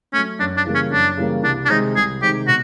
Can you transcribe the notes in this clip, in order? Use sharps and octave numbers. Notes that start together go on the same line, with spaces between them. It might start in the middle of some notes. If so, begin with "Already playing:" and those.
F#3 A3 C#4
F#2 D4
D4
C#3 E3 G3 A#3
C#4
F#2 D4
C#3 E3 G3 A#3
C2 D4
D4
C3 D#3 G#3 D#4
C2 G#4
C3 D#3 G#3 G4
B2 F#4